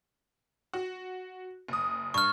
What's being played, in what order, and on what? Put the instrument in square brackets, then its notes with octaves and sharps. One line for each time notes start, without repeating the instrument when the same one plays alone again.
[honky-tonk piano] F#4
F#1 D#6
[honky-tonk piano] G2 [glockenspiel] C#6 F6